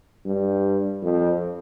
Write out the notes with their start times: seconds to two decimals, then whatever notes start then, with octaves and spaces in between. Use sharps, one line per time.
0.26 G2
1.02 F2